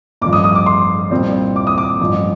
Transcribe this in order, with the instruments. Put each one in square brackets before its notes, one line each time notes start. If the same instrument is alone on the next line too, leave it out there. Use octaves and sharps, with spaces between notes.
[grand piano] A1 G2 F3 D6
D#6
D#6
D6
C6
C2 A#2 G3 C4
D6
D#6
D6
A1 G2 F3